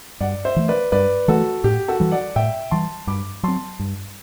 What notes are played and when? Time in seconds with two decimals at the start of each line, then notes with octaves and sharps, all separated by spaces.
0.21 G2 D5 F#5
0.45 C5 E5
0.56 E3 A3
0.68 B4 D5
0.92 G2 B4 D5
1.28 E3 A3 F#4 A4
1.64 A2 G4
1.88 F#4 A4
2.00 E3 G3
2.11 D5 F#5
2.36 A2 E5 G5
2.71 E3 G3 A5 C6
3.07 G2 B5 D6
3.43 F#3 C4 A5 C6
3.79 G2